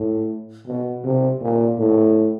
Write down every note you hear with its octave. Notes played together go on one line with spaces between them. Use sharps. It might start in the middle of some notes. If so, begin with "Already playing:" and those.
Already playing: A2
B2
C3
A#2
A2